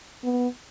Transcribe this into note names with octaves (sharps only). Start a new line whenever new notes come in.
B3